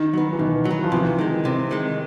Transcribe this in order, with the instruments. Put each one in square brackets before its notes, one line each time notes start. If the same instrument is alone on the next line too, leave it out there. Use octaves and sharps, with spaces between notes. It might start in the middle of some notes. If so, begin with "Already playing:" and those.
Already playing: [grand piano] D#3
[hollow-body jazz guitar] F#3 B3
[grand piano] E3
[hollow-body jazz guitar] B2 [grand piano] D#3
[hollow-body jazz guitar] F#3
B3
[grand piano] F3
[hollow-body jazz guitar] C3 [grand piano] E3
[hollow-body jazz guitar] D#3 G#3
C3
D#3 G#3